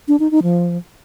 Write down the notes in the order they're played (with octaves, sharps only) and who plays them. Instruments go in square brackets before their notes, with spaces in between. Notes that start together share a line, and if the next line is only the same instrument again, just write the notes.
[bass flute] D4
D#4
D#4
F3